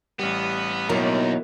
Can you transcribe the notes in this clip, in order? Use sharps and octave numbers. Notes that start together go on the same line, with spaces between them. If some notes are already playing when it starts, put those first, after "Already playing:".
A1 G3 B3
D#2 B2 F#3 B3 D#4 E4 A#4